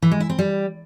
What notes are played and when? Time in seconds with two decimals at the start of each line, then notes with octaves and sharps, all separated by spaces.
0.02 E3
0.11 G#3
0.20 E4
0.29 C4
0.39 G3